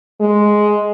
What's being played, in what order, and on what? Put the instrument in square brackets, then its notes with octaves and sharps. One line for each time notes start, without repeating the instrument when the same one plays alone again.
[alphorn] G#3